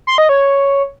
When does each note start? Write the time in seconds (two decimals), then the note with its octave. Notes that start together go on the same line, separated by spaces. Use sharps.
0.07 C6
0.18 D#5
0.29 C#5